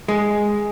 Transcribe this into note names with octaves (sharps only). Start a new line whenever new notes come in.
G#3